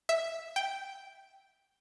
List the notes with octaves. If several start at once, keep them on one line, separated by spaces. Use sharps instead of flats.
E5
G5